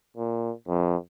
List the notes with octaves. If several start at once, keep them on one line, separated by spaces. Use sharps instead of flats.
A#2
F2